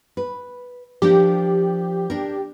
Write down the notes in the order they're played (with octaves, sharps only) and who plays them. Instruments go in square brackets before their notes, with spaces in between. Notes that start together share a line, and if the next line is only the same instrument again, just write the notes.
[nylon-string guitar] B4
[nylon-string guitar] F3 D4 A#4 [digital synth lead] G4
[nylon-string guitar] D4 A#4